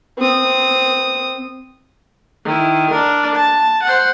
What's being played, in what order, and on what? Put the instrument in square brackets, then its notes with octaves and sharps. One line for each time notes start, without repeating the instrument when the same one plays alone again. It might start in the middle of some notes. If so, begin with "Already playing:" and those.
[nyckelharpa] C4 D#6
[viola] D#3 E4
D4 A#4
A5
C5 F#5